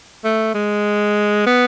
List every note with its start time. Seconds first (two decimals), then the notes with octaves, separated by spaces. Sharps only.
0.24 A3
0.54 G#3
1.46 B3